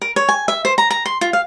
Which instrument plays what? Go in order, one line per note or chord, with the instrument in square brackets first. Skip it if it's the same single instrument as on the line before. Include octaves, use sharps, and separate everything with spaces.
[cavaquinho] A#4
C#5
G#5
E5
C5
A#5
A#5
C6
F4
F5